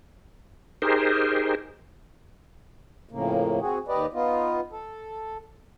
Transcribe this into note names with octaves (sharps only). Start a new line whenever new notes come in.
D#4 G4 G#4 A#4 C5
F2 A2 C#3 A#3
C4 F#4 G#4
D#2 G4 B4 D5 D#5
B3 D#4 F4
A4